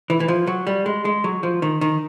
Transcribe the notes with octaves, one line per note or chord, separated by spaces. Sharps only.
E3
E3
F3
F#3
G3
G#3
G#3
F#3
F3
D#3
D#3